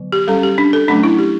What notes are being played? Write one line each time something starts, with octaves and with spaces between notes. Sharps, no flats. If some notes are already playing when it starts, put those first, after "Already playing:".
Already playing: D3 F#3 B3
G4
G3 C#4 A4
G4
D4
A4
F#3 A3 C#4 D4
E4
G4